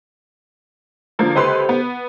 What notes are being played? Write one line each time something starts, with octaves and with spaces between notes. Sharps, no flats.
D3 F3 A#3
C#2 G4 A4 B4 C5 C6
B3